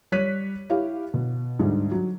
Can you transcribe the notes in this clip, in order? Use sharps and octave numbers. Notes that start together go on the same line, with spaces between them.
G3 C#5 F#6 B6 D#7
E4 G4 C#5 F5
B2
D2 G#2 G3 G#3
F#3